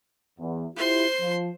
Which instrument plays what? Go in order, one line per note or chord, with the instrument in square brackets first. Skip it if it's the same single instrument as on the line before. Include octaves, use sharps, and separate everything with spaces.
[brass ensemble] E2
[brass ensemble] E4 F4 G4 [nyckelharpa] C5 C6
[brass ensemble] F3